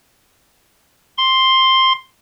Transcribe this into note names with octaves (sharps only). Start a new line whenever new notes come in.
C6